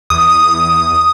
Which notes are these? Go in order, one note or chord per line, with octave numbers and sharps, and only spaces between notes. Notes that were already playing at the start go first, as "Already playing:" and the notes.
E2 D#6